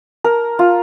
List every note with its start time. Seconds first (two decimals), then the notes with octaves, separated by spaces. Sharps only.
0.24 A#4
0.59 F4